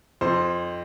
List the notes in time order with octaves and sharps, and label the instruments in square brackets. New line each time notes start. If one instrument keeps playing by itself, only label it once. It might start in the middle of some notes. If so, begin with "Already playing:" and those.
[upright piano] F2 C5